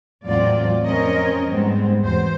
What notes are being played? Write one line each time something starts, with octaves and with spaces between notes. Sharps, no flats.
E2 A2 F#3 C4 F4 D5
F2 C4 C#4 A#4 C#5 D#5
G#2 G3 G#3 B3 C4
E2 F#3 C5